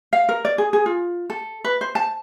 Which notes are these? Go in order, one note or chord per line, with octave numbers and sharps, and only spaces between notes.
F5
A#4
D5
G#4
G#4
F4
A4
B4
C5
A5